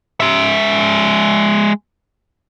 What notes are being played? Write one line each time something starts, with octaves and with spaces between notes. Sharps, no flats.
G#3 E5